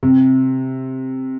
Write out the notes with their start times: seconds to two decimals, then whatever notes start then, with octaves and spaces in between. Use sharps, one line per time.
0.03 C3